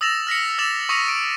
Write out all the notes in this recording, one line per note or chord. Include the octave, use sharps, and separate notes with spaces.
D#6 E6 A6 A#6 E7 F7
F6 A#6 B6 C#7
D6 E6 A6 E7 F7
C#6 D#6 A#6 B6 C#7 D#7
D7